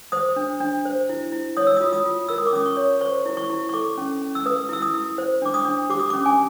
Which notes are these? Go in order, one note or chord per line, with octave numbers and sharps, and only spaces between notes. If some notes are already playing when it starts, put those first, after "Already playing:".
C5 D#6
D4
D4
C5
E4
E4
C#5 D#6
E6
F4 D#6
D#6
F4
A#4 E6
D#6
D6
C#4 D#6
C#6
C#5
C5 C#6
E4
C#6
E4
C#6
A4 D6
C#4
C#4
E6
B4 D#6
E4 E6
D#6
E4
C5
D4 D6
D#6
D4
G4 D6
D#6
C#4 D6
G#5